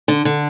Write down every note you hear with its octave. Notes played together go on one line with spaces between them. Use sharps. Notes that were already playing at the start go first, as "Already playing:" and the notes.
D3
D3